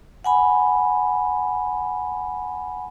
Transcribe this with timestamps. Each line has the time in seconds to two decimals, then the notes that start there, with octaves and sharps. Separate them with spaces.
0.24 F#5 G#5 B5